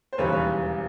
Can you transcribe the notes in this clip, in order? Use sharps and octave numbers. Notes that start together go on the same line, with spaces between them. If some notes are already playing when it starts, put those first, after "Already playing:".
C5
E1 D#2 C#3 E3 G3 B4 C#5
B4 C#5